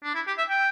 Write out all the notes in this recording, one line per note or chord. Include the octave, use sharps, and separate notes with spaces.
D4
E4
G4
E5
G5